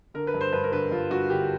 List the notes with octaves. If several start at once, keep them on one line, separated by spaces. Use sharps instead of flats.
D3 A#4
B4
G2
C5
G2 B4
A#4
D3 B4
G2 F4
G2 F#4
D3 G4